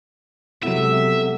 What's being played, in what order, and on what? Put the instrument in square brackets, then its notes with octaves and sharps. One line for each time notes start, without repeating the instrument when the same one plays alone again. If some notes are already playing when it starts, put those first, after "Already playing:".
[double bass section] C3 G#3 [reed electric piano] F#3 E4 [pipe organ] B3 A4 [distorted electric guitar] E5